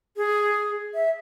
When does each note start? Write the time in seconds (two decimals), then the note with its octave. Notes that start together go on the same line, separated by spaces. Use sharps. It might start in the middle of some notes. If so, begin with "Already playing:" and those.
0.17 G#4
0.94 E5